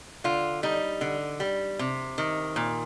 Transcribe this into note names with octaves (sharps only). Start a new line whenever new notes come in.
D3 F4
G3 D#4
D3
G3
C3
D#3
A#2